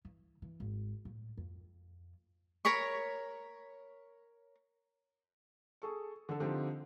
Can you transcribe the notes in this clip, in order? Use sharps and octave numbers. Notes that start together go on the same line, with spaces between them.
E3
E3
G#1
A2
F2
A#4 C#5 B5 C#6
G#4 A4 C#6
D3 A4
D3 F3 C4 D#4 G4